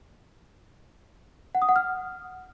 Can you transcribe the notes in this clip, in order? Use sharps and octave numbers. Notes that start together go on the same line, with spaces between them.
F#5
D#6
F#5
F6